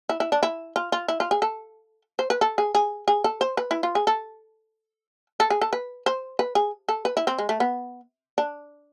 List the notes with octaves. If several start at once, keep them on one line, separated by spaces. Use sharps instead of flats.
E4
E4
D4
E4
F4
F4
E4
F4
G#4
A4
C5
B4
A4
G#4
G#4
G#4
A4
C5
B4
E4
F4
G#4
A4
A4
G#4
A4
B4
C5
B4
G#4
A4
B4
E4
C4
G#3
A3
B3
D4